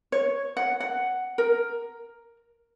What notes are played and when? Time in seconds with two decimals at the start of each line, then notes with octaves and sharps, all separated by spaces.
0.12 C#5
0.57 F#5
0.80 F#5
1.38 A#4